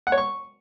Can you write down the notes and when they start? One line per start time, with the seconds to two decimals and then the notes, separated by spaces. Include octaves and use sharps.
0.07 F#5
0.12 C#5
0.18 C#6